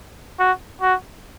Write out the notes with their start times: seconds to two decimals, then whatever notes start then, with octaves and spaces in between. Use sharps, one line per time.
0.39 F#4
0.81 F#4